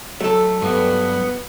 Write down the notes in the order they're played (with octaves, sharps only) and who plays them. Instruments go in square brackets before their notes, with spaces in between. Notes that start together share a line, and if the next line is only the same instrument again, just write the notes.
[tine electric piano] F#3 [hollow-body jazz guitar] A3 A4
[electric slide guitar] G2 [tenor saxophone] B3